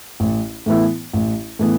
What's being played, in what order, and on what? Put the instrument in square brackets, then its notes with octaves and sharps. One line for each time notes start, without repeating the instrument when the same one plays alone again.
[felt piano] A1
A2 E3 B3 E4
A1
A2 E3 B3